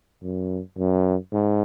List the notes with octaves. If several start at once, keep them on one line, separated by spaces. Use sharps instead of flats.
F#2
F#2
G#2